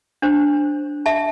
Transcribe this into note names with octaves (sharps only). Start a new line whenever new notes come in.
D4 C5
E5 A5